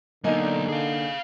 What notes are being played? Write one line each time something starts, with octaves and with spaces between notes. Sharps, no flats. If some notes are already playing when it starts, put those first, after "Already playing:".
D3 F#3 A#3 B3 D#4 D#5 G#5
G#4 F5